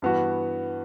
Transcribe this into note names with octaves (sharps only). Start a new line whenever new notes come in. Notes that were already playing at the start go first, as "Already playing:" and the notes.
G2 E3 B3 F#4